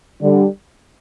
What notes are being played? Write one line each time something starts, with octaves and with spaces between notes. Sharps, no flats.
D3 G3 D4